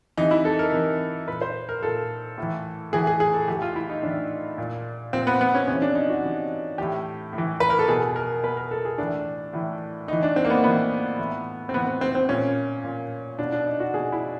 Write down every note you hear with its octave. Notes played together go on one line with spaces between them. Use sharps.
C3 E3 D#4
E4
A4
A#4
C3 E3
A#2 B4
C5
A#4
A#2 A4
A2 E3
A2 E3 G#4
G#4
G#4
A4
A2 E3 G4
F4
E4
D#4
A2 E3 D4
A#2
A#2 C4
B3
B3
C#4
C3 E3 C#4
D4
D#4
F#4
C3 E3
A2 E3 G4
A2
E3
B4
A#4
A4
B2 G#4
A#4
B2 B4
A#4
A4
G#4
A2 E3 D4
A2 E3
A2 E3 D#4
D4
C4
A#3
B3
A2 E3 B3
A2 E3
C4
A2 E3 B3
B3
C4
C4
A#2 C#4
A#2
B2 D4
D4
D#4
F#4
B2 G#4
E4